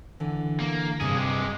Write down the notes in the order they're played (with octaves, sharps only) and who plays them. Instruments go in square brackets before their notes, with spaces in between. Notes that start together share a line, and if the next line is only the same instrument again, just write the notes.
[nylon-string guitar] D3 E3
[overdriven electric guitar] A#3
[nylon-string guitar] G2 C3 [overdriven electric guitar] A#3 G#4
[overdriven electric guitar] G#3 G4